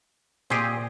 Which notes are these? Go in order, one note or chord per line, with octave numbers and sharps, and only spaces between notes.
A#2 C4 G4 G#4 D#5